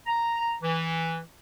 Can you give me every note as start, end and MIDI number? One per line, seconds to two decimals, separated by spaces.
0.07 0.55 82
0.62 1.19 52